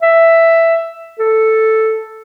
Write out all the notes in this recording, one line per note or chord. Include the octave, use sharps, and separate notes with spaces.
E5
A4